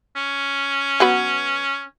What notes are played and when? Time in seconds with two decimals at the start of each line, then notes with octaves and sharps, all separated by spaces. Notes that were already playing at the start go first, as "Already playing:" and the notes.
0.16 C#4
1.00 F#3 B3 B4